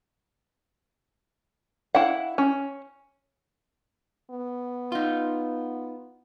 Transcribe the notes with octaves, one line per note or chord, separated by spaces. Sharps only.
E4 F5 F#5
C#4
B3
D#4 F4